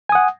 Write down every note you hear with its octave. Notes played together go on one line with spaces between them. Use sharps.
F#5 G#5 D#6